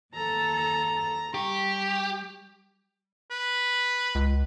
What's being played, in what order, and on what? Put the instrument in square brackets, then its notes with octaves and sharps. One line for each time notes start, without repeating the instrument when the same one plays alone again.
[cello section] D#2 A4 [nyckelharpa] A#5
[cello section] G3 [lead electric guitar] G4 [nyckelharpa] C#6
[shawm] B4
[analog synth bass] C#2